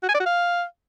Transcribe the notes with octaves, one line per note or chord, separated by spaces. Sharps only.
F#4
G#5
D5
F#4
F5